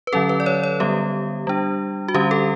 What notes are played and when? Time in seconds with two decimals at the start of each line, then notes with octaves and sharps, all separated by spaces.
0.07 B4
0.13 D3 F#3 C#4 A4
0.29 B4
0.40 D5
0.46 C#5
0.63 C#5
0.80 D3 G3 B3 G4
1.47 G3 D4
2.08 F#4
2.14 D3 G3 C#4 G4
2.31 A4